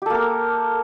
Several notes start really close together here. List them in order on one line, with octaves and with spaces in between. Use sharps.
G4 A4 A#3 A#4